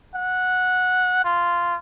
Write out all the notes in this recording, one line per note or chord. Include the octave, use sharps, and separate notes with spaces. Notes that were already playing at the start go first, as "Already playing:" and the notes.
F#5
F4